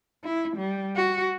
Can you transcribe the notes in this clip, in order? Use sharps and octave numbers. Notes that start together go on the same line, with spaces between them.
E4
G3
F#4